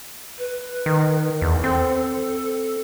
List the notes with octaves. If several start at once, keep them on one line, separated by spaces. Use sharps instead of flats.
B4
D#3
E2
C4 A4